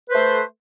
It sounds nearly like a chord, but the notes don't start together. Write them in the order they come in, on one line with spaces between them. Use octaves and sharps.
B4 C5 A3